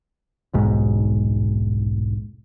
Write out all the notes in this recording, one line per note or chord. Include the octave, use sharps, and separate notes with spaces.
D#1 B1 G#2